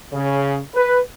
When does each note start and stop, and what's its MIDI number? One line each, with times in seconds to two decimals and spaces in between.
0.13 0.58 49
0.75 0.99 71